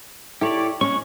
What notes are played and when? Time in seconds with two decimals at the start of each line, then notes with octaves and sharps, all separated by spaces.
0.41 E4 G4 A4 C#5 D5
0.81 G#3 C#4 C#6